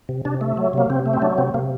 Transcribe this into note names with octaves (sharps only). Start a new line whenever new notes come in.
C3
C3 D4
A3
F#3
C3 A#3
C3 C4
A3
C4
F#3 D4
C3 C4
C3 A#3